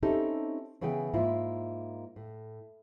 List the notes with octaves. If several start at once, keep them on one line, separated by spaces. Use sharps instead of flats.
C4 C#4 D#4 E4 G4 A4
C#3 E3 B3 G#4 G5 G#5
G#2 A#3 E4 F4
A2